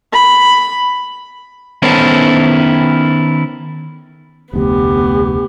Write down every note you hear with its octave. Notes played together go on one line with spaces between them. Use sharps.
B5
D#3 B3 C#4 E4 A4 C5
F1 D2 B3 G4